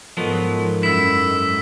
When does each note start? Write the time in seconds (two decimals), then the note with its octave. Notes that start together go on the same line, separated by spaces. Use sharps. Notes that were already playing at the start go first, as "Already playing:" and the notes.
0.17 G#2 F3 F#3 B3 A4 A#4 D#5
0.83 F#2 E4 E6 B6